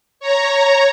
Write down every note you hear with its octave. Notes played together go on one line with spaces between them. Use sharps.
C#5 A#5